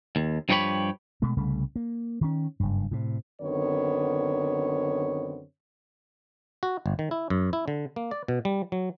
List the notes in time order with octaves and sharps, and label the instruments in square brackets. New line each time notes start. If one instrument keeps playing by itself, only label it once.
[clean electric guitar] D#2
G2 F3 D#4 G4 C#5 B5
[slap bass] B2 G#3 A3
C2 C#3 G3 A3
A#3
D#3 C#4
F#1 G2
A2 C3
[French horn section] F#2 D3 D#3 B3 C4 C#5
[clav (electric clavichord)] F#4
G1
D#3
E4
F#2
E4
D3
A#3
D5
B2
G3
F#3